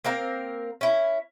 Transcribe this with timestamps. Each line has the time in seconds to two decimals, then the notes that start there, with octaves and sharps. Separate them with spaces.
0.05 A#3 C4 A#4 F5
0.81 C#4 E4